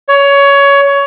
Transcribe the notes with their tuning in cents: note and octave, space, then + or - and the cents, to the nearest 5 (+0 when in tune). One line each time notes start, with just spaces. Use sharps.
C#5 +20